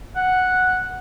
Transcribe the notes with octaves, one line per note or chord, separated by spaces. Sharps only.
F#5